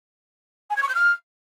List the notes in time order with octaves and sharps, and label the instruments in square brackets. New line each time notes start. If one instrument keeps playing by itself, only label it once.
[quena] G#5
G#6
C#6
G6
F6